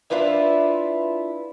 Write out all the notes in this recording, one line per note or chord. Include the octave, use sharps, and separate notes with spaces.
D4 E4 F4 B4 E5